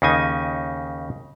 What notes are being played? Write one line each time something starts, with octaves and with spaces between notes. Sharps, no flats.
D#2 C#3 D#4 G#5